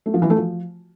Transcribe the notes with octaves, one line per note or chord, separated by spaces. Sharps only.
A3
F3
E3
A3
F3